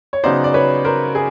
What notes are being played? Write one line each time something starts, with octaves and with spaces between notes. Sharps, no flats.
C#5
C#3 F#3 B3 D#4 C5 D5
D5
B4 C#5
A#4 C5
G#4